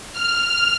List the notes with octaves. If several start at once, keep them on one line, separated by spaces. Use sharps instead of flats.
F6